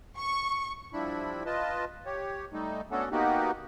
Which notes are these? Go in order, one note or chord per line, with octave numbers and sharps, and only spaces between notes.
C#6
F3 G3 D4 E4 B5
F4 B4 D#5 A5
G4 C#5
G3 A3 D#4
A3 B3 C#4 D4 F#4 A4
A#3 B3 D#4 F#4 G4